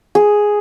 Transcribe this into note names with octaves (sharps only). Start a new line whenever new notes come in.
G#4